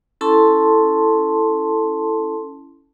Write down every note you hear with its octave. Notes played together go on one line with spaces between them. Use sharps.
C#4 E4 A4 A5 C6